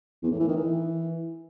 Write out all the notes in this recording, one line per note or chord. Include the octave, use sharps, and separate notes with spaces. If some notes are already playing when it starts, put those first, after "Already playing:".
E2
A2
E3
D#3
E3